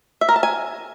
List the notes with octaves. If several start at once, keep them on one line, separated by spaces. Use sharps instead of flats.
E5
A#4
A5
G#5